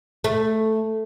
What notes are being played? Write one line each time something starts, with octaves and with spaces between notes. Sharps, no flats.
A3